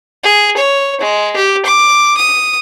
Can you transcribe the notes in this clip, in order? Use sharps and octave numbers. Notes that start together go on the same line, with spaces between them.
G#4
C#5
G#3
G4
D6
D#6